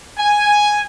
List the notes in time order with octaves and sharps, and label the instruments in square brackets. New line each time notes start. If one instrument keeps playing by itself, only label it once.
[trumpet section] G#5